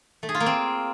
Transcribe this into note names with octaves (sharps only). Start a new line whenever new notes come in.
A3
G#4
F4
A#3
C4